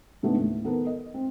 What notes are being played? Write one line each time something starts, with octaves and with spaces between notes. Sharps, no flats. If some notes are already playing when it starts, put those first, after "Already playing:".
G#2 C#3 A3 B3 C#4 D4
D#2 A2
D#3 B3 A4 A#4
D#5
C4